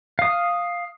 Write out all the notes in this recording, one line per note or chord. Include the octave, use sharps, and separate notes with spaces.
F5 D#6